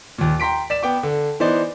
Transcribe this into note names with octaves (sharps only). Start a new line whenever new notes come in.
D#2 A#2
G5 A#5 C6 B6 D7
D5 B6 E7
B3 G5 D6
D3
E3 B3 D#4 C5 D5